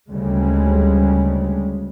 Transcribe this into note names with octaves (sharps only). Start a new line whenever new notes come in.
D2 C#3 G3 G#3